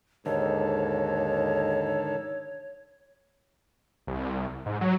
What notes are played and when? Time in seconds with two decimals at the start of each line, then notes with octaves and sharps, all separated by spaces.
0.26 D#2 G#2 D3 D#3 A4 C#5
4.07 C2
4.66 G#2
4.81 F#3